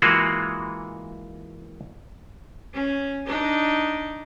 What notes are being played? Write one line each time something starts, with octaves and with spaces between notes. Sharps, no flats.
E3 G#3 A#3 F4 F#4
C#4
D4 D#4